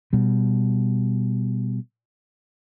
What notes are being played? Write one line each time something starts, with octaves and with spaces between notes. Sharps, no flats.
B2 G3